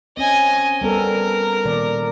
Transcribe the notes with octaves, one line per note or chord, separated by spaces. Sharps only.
C4 C#4 D#5 G#5
G3 B3 A4 A#4
A#2 D#3 D5